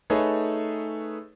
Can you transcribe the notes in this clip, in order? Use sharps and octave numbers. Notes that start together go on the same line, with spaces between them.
A3 D#4 G#4 A4 B4 C#5